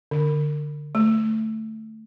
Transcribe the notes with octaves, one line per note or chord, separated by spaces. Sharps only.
D3
A3